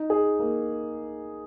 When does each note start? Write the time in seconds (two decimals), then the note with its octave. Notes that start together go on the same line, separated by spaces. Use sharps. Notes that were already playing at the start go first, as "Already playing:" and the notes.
Already playing: D#4
0.10 G#4
0.39 A#3